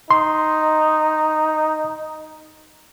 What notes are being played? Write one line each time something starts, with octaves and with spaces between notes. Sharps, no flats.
D#4 C6